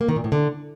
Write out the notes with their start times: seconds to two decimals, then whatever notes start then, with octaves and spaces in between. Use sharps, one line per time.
0.01 A#3
0.08 D#3
0.16 A#2
0.24 A2
0.32 D3